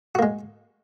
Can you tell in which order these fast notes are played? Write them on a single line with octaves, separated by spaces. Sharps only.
F#4 A#3 G#3